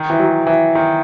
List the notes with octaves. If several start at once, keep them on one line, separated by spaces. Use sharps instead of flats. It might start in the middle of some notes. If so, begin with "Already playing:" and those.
Already playing: D#3
E3
F#3
E3
D#3